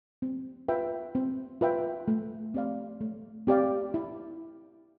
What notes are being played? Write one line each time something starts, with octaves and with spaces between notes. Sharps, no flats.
C4
F4 B4 E5 G5
C4
F4 B4 E5 G5
A3
C4 G4 D5 F5
A3
C4 G4 D5 F5
E4